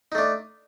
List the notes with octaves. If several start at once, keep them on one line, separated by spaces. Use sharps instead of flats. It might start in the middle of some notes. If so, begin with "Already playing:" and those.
A3 D4 D#4